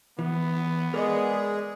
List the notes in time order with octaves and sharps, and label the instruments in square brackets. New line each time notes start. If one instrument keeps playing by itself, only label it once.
[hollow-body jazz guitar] E3 [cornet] B3
[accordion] G#3 G#4 [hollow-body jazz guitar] A#4 D#5 [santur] D5